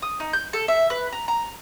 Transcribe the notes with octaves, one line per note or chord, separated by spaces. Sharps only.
D#6
D#4
G6
A4
E5
B4
A#5
A#5